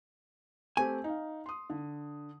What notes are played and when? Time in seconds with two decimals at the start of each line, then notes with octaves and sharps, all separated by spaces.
0.77 A3 C4 G4 G#5
1.04 D#4 F5
1.46 C6 D#6
1.70 D3